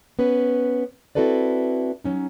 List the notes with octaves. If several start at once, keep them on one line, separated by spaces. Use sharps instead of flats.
B3 C#4 B4
C4 E4 F#4 A4 B4 D5
F#3 C#4 D#4